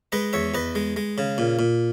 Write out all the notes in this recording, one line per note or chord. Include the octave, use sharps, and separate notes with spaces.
G#3 B4 D#5
E2 C#5 E5
E2 B4 D#5
G#3
G#3
C#3
A#2
A#2